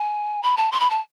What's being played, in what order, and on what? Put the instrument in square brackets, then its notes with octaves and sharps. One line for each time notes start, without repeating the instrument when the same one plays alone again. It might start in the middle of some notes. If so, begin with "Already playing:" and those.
Already playing: [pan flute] G#5
B5
A5
C6
B5
A5